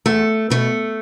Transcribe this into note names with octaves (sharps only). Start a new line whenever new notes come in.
E2 A3
B2 A3